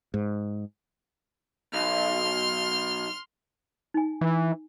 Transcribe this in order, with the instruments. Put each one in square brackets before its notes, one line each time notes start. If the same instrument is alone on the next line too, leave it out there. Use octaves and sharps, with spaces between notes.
[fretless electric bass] G#2
[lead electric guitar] B1 [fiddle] C6 F6
[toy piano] D#4 G#5
[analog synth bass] E3